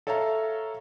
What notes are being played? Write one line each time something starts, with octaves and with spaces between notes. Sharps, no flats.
A4 C#5 E5 F5 A#5